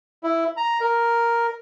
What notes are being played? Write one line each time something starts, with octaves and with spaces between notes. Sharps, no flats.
E4
A#5
A#4